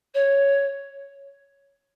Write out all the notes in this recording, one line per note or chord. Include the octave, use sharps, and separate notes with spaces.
C#5